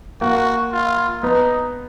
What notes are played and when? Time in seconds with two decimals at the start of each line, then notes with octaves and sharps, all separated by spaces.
0.21 A#3 F#4
0.72 F4
1.23 B3 D#4